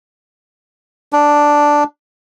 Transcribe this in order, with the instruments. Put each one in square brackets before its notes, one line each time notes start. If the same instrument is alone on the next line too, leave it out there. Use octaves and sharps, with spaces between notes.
[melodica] D4